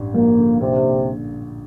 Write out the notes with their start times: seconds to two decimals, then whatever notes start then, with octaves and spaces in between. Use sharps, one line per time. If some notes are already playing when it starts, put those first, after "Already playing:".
Already playing: A1 G2
0.14 F3 A#3
0.37 D3
0.61 A#1 C3
0.85 A#2